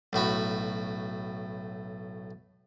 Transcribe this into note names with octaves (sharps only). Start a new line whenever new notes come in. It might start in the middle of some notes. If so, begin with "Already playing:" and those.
B1 A2 F#4 B5